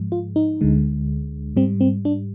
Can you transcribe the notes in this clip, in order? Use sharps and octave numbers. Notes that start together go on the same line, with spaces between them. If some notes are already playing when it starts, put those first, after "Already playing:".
Already playing: G#2 F3 G#3
F4
D#4
D2 D3 G#3
G#2 G3 C4
C4
D4